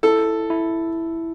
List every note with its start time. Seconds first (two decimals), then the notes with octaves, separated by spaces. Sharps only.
0.03 E4 A4
0.50 E4